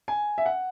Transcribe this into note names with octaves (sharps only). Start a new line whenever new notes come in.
G#5
E5
F#5